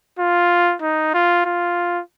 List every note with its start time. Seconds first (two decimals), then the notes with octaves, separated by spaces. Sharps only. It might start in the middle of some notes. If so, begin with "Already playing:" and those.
0.19 F4
0.82 D#4
1.14 F4
1.45 F4